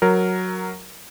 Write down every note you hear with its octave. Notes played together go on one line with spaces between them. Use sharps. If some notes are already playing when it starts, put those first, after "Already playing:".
F#3 A#4